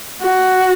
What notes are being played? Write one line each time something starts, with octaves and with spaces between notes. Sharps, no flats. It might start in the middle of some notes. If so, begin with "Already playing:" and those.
F#4